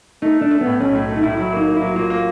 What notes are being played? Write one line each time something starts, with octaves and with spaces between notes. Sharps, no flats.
A3 D#4
A3 D4
A3
A2 B3
B1 C#4
A2
A3
D#4
A2 E4
F#3 E4
A#3 D#4
A#3
E4
F#3
A#3 F4
A#3